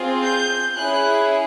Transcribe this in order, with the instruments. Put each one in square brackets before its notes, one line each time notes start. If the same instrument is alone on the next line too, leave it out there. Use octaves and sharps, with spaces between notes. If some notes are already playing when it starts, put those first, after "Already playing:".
Already playing: [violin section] C4 F4 G#4
G6
C#4 E4 G#4 F#6